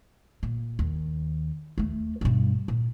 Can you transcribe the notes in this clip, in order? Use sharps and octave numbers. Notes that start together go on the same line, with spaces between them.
A#2
D#2
D#2 A3
G2 B2
A#2